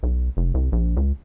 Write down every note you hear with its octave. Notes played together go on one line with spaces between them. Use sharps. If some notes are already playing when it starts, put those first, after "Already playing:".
B1
F1
C2
A#1
C#2